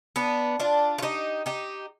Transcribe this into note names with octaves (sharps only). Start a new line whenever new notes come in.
B3 D4
D4 F4
F4
D#4 G4
D#4 G4